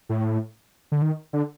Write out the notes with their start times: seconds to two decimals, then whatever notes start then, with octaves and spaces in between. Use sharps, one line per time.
0.09 A2
0.92 D3
1.02 D#3
1.33 D3